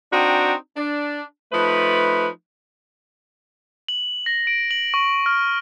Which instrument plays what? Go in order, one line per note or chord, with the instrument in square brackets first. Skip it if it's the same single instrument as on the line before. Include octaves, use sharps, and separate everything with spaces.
[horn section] C4 D4 D#4 F#4 G5 A#5
D4
F3 A3 D#4 B4
[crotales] F#7
A#6
D7
F#7
C#6
F6